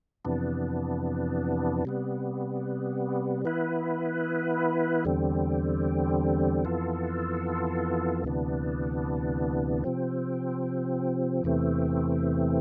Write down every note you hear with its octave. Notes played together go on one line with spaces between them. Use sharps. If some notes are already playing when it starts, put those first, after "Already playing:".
F2 C3 E3 B3 D4
C3 G3 B3
E3 B3 E4 B4
E2 D3 G3 C4
F2 E3 B3 F4 A4
D2 C3 E3 B3 D4
C3 F3 C4
E2 C3 E3 A3 C4